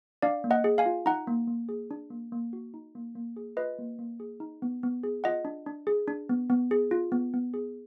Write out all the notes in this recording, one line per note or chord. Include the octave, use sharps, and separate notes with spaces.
D4 D5 F5
A#3
D#5 F#5
G#4
F5 G#5
F4
D#4 F#5 A#5
A#3
A#3
G#4
D4
A#3
A#3
F#4
D#4
A#3
A#3
G#4
F4 B4 D#5
A#3
A#3
G#4
D#4
B3
B3
G#4
F4 D#5 F#5
D4
D4
G#4
D4
B3
B3
G#4
F4
B3
B3
G#4